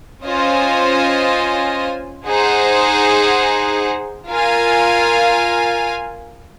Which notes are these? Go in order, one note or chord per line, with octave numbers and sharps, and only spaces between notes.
C#4 F4 C5 D#5 G#5
D#4 G#4 C5 F#5
F4 A#4 F5 G#5